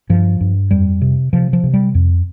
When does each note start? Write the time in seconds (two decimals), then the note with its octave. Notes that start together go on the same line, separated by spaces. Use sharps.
0.09 G2 F3
0.41 G2
0.71 F2 G3
1.02 C3
1.33 C3 F3
1.53 F3
1.64 C3
1.74 G3
1.95 F2